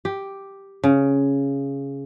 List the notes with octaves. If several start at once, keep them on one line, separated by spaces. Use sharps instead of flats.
G4
C#3